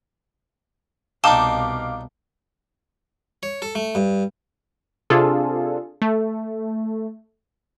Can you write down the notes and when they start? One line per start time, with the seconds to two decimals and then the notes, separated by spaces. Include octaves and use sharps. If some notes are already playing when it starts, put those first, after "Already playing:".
1.24 C2 B2 D4 D#4 F5 G5 A5 D6
3.43 C#5
3.62 A4
3.75 A3
3.95 G2
5.10 C3 D4 F4 G#4 A4
6.02 A3